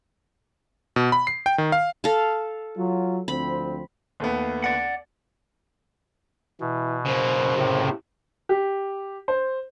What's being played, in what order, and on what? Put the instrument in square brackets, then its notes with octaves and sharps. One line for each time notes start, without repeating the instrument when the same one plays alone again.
[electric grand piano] B2
B5
C7
G5
D#3
F5
[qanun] A4 F5
[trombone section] F#3 F4
[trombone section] D2 F3 C4 [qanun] B5
[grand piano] D#2 A3 B3
[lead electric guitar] D5 F#5
[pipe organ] B2 [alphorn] E3
[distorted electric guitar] C#3 A#3 [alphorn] C5
[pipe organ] A2 C3
[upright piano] G4
C5